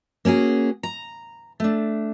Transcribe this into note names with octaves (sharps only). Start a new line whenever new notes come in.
A#3 C#4 F#4 G#4
A#5
A3 D4